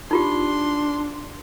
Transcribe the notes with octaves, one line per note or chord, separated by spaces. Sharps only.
D4 D#4 F4 G4 C6